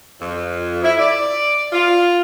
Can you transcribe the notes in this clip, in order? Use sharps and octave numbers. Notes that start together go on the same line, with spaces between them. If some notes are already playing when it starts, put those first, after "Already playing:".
F2
E4
D5
F4